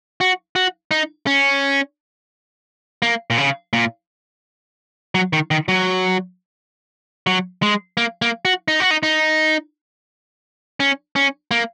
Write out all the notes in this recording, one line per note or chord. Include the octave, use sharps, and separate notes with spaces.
F#4
F#4
D#4
C#4
A#3
A#2
C#3
A#2
F#3
D#3
D#3
F#3
F#3
G#3
A#3
A#3
F#4
D#4
F#4
D#4
D#4
C#4
C#4
A#3